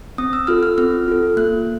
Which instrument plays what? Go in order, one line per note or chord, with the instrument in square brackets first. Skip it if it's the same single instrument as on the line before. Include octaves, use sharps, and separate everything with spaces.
[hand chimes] C4 D#6
E6
F4 A4 F6
F6
C4 F6
F4 A4
A#3 F#6